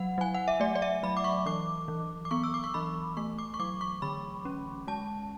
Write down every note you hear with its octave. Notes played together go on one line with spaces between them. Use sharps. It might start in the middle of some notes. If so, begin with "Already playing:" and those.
Already playing: F#3 F#5
F#3 G#5
F#5
E5
A3 D5
D5
E5
F#3 B5
D6
C#6
E3 D6
E3
D6
B3 C#6
E6
D6
C#6
E3 B5
A3 C#6
D6
C#6
F#3 D6
C#6
D3 B5
C#4
G#3 A5